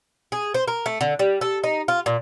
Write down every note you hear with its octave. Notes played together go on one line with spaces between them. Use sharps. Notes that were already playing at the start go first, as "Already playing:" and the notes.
G#4
C5
A#4
A3
D3
G3
A4
D#4
F4
A#2